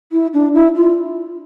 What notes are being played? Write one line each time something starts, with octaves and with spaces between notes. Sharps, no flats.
E4
D4
E4
F4